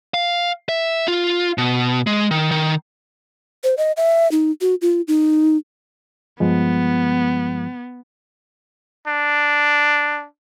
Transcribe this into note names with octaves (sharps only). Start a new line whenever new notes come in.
F5
E5
F4
B2
G#3
D#3
D#3
C5
D#5
E5
D#4
F#4
F4
D#4
G2 F3 G#3 B3
D4